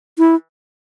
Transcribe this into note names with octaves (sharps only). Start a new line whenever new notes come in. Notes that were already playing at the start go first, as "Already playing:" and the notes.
E4